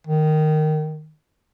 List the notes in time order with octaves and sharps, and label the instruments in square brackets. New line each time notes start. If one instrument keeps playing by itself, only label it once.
[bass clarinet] D#3